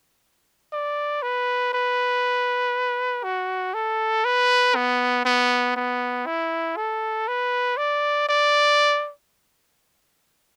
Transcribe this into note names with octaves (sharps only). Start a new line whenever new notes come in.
D5
B4
B4
F#4
A4
B4
B3
B3
B3
E4
A4
B4
D5
D5